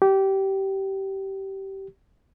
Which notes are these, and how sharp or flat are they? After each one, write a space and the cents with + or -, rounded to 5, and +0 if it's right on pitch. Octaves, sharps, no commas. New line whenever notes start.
G4 -20